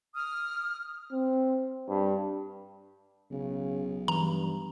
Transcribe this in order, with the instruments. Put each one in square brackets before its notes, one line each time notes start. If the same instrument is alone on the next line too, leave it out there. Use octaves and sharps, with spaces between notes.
[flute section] D#6 F6
[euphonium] C4
G2
[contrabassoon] B1 [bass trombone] C#3
[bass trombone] G2 [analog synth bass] E3 [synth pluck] A#5